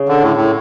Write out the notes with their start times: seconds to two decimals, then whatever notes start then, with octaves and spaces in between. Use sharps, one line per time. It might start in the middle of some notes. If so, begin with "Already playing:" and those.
Already playing: C#3
0.08 D3
0.21 A2
0.36 A2